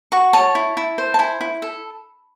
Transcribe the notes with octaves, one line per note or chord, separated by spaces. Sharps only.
F#4 C#6
C#5 A5
E4
E4
C5
A5
E4 G#5
E4
A4